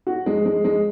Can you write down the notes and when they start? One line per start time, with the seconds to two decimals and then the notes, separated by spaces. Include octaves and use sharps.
0.07 F#4
0.26 G#3
0.45 G#3
0.65 G#3